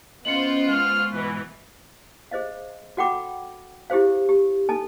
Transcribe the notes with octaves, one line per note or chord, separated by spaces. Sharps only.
B3 C#4 F4 C5 D#5 C#7 F#7
G#3 C#6 F6
G#2 B2 E3 B4
G#4 C5 D#5 F5
F#4 A4 F#5 G5 B5 D6
E4 G4 G#4 C5 F5
G4
D#4 A4 G#5 A5